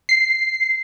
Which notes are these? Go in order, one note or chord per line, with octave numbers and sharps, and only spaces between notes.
C7